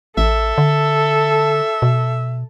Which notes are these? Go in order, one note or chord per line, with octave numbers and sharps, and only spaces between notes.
A1 A4 E5
D3
B2